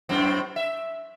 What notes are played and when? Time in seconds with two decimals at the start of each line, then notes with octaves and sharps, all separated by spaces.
0.09 F#2 A2 C4
0.56 E5